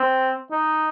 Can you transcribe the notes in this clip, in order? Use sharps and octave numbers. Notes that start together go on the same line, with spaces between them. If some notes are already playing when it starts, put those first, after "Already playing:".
Already playing: C4
D#4